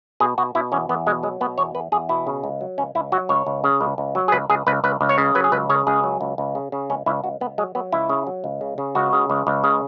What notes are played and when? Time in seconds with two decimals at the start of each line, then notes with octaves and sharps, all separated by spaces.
0.20 B2 G#4
0.38 B2 F#4
0.55 B2 E4
0.72 E2 C#4
0.89 E2 B3
1.06 B2 G#3
1.23 F#3 G#3
1.41 B2 B3
1.58 E2 C#5
1.75 E2 B4
1.92 E2 G#4
2.09 B2 E4
2.27 C#3
2.44 C#2
2.61 F#3
2.78 C#2 C#4
2.95 C#2 E4
3.12 F#3 F#4
3.29 C#2 C#5
3.47 C#2
3.64 C#3
3.81 C#2
3.98 C#2
4.15 F#3
4.28 G#4
4.32 C#2 B4
4.49 C#2 G#4
4.67 C#2 B4
4.84 C#2 B4
5.01 C#2
5.09 C#5
5.18 C#3
5.35 F#3 B4
5.44 G#4
5.52 C#2 B4
5.69 C#3 C#5
5.87 C#2 G#4
6.04 F#3
6.21 C#2
6.38 C#2
6.55 C#3
6.72 C#3
6.90 C#2 C#4
7.06 C#2 E4
7.24 C#2 F#4
7.41 C#2 B3
7.58 F#3 G#3
7.75 F#3 B3
7.92 C#2 E4
8.09 C#3
8.27 F#3
8.44 C#2
8.61 C#3
8.78 C#3
8.95 C#2 F#4
9.13 C#3
9.30 C#2
9.47 C#2
9.64 C#3